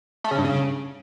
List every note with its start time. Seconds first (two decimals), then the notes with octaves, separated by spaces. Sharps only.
0.24 A3
0.31 C#3
0.38 G2
0.44 C#3